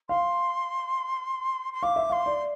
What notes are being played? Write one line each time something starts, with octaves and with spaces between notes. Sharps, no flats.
F5 C6
C6
F5 D6
E5
F5 C6
D5